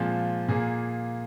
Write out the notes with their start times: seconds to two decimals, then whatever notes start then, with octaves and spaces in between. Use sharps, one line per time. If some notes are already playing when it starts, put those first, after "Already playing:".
Already playing: A#2 F3 G#3 C4 F4
0.48 A#2 A#3 G#4